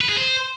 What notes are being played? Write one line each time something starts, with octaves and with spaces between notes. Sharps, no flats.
B4
G#4
C5